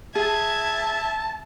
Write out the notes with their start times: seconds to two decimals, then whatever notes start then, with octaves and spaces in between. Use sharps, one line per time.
0.15 G#4 E5 A5 G#6